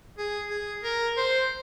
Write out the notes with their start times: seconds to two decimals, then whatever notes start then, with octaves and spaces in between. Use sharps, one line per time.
0.18 G#4
0.50 G#4
0.84 A#4
1.17 C5